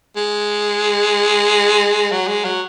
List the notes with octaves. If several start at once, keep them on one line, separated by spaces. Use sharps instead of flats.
G#3
F#3
G#3
F#3